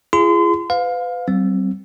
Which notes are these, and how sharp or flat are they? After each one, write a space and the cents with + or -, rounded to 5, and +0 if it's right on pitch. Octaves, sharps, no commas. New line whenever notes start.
F4 -40 G#4 +0 C6 -35
B4 +35 F5 +20
G3 -45 C4 +0